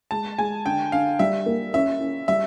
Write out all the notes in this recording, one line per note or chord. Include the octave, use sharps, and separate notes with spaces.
G#3 A5
G#3 G#5
D3 G5
D3 F5
G3 E5
A#3
C#4 E5
C#4
G3 E5